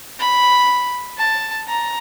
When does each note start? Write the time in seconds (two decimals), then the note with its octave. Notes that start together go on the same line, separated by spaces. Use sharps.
0.19 B5
1.18 A5
1.68 A#5